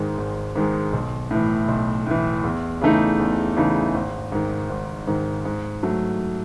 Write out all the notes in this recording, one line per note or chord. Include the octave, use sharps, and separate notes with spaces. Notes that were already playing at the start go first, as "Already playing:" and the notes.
Already playing: G#1 G#2 D#3 G#3
G#1
G#2 D#3 G#3
B1
A2 E3
B1
A2 E3
E2
C#3 E3 A3 D#4
E2
C#3 E3 A3 D#4
G#1
G#2 D#3
G#1
G#2 D#3
G#2
F#3 A3